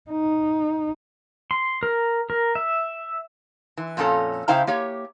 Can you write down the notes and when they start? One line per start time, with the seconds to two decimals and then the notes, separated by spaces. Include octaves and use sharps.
0.10 D#4
1.51 C6
1.83 A#4
2.30 A#4
2.55 E5
3.77 E3
3.97 F2 A#2 C#4 D4 A4 A#5
4.48 C#3 E4 C5 F5 G5 A#5
4.67 A#3 G4 C#5